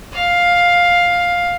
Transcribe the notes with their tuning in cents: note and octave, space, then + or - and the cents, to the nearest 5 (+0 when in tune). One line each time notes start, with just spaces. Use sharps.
F5 +10